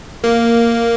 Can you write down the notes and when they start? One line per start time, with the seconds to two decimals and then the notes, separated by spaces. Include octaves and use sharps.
0.24 A#3